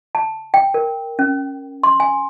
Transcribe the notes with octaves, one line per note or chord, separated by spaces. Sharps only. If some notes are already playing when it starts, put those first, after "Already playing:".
A5
G5
A#4
C#4
C6
G#5